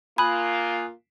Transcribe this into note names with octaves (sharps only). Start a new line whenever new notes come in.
A#3 F4 G#5 B5 D#6 F#6